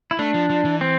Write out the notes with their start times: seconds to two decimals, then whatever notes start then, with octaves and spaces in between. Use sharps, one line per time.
0.11 E4
0.19 A3 D4
0.34 F3
0.50 F3
0.65 E3
0.81 C4